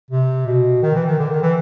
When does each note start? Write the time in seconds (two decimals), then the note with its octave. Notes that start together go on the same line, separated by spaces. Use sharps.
0.11 C3
0.46 B2
0.82 D#3
0.95 E3
1.07 D#3
1.19 D3
1.31 D#3
1.42 E3